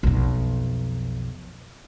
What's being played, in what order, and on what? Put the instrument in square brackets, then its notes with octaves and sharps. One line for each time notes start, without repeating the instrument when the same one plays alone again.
[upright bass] B1 F2